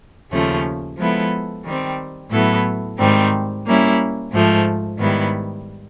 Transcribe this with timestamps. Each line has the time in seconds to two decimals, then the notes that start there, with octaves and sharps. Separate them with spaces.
0.32 D#2 C#3 F3 A3 C#4
0.98 F3 G#3 B3 E4 A4
1.65 D#3 G3 C4
2.32 A2 F#3 B3 E4 A4
2.99 G#2 D#3 G3 C4
3.66 G3 A#3 C#4 E4
4.33 G#2 F3 A3
4.99 G#2 D#3 G3 B3 E4